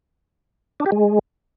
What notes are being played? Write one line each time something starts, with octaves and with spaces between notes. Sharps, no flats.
D4
G4
G#3